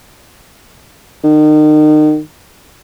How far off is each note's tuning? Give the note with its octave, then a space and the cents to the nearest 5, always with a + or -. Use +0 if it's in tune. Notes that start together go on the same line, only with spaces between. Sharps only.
D#3 -35